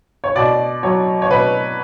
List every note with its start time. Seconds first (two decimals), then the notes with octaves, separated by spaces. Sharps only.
0.24 C#5
0.36 B2 D5
0.83 F#3 C#5
1.22 C#5
1.30 B2 B4